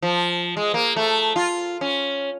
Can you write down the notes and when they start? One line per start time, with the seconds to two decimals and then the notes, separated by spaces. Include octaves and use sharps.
0.02 F3
0.57 G#3
0.74 A#3
0.96 A3
1.36 F4
1.81 C#4